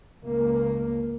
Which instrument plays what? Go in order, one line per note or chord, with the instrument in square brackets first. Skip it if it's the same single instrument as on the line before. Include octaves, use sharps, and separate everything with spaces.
[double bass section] C#2 A#3